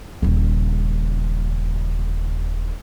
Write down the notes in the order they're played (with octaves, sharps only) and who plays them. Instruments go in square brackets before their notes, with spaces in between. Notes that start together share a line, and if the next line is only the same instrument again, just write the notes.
[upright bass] D#1 C#3